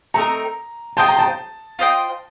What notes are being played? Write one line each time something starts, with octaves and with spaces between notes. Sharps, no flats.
A3 C4 D#4 A#4 A#5
F4 C5 D#5 G5 A5
A#5
A5
F4 C5 D#5 G5